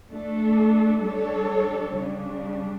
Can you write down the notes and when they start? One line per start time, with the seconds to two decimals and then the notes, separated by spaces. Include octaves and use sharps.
0.11 A3 D4 A4
1.03 G3 D4 A4 C#5
1.97 C#3 G3 D4